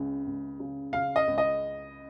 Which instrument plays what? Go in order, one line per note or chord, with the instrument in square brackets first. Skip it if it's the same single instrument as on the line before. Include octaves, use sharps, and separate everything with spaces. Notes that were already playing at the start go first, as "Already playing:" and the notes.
Already playing: [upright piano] C#2 C#3
C#2
C#3
[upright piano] C#3 [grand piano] F5
[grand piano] D#5
[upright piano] C#2
[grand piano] D#5